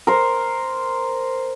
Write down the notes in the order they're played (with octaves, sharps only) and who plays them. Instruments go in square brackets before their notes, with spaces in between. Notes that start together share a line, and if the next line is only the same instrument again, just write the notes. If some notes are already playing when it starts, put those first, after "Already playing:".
[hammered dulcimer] A#4 C5